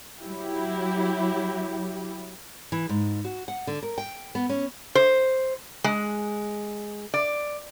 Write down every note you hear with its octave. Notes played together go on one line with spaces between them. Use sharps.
F#3 E4 G4
E3
G#2
F#4
F#5
D3
A#4
G5
B3
C#4
C5
G#3
D5